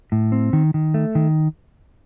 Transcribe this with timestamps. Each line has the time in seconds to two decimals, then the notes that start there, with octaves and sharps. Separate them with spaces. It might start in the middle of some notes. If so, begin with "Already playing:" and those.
0.12 A2
0.32 C4
0.53 D#3
0.74 D#3
0.94 A3
1.15 D#3